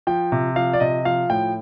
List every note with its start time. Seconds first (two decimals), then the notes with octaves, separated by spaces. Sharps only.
0.07 F3 G5
0.32 C3
0.56 F3 F5
0.73 D5
0.80 C3 D#5
1.05 F3 F5
1.30 A2 G5